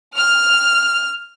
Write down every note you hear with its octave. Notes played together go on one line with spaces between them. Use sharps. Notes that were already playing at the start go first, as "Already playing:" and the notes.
F6